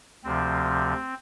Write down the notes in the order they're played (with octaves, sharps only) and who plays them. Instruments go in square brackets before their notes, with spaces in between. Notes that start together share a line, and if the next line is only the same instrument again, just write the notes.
[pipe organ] D2 C3 F3 C4